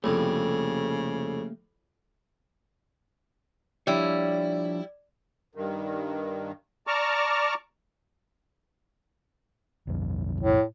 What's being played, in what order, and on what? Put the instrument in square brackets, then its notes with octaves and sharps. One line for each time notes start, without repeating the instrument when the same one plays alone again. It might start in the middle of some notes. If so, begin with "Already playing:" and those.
[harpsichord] C2 F2 [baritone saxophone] C#3 [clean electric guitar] A3 A#3 G4
[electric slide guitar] F3 D4 C#5 [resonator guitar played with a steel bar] G3 E4 [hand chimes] D5
[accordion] G2 D#3
D5 A5 A#5 C#6 D6 F6
[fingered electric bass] B1 F2
[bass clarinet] A2